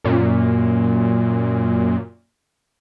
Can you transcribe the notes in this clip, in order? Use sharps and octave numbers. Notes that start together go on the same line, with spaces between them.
F#2 A#2